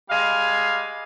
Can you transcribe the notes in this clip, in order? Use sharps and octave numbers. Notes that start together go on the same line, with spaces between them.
G3 G#3 F5